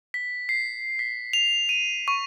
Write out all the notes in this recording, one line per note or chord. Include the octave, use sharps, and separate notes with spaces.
B6
C7
B6
F7
D#7
C#6